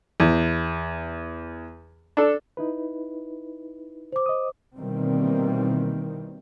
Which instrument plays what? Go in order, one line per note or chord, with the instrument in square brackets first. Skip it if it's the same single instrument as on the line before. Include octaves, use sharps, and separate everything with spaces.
[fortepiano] E2
D4 A4
[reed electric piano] D#4 E4 B4
[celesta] C5 D6
[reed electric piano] D#5 D#6
[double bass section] B2 D#3 E3 G3 A#3 C4